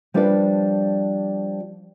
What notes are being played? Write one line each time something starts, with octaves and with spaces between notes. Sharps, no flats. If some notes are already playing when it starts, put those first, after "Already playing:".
F3 G3 D4 F4 B4 D5